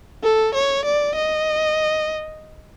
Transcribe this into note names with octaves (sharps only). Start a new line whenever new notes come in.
A4
C#5
D5
D#5